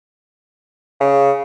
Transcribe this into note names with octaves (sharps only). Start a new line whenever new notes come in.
C#3